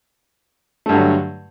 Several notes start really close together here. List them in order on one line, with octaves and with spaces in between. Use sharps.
A3 G2 D3 F#3